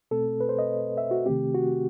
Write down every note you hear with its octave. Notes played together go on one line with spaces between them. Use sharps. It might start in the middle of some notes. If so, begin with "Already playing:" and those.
B2 A3 C4 A4
B4
C5
D#5
E5
F#4
C3 D#3 A3 C4 G4
F#4